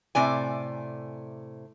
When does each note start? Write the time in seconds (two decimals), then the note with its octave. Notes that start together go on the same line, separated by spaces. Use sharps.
0.15 A2 C3 D5 G#5